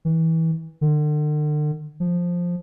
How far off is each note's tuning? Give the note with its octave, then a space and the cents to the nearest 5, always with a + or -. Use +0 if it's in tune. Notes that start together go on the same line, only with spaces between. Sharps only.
E3 -25
D3 +40
F3 +5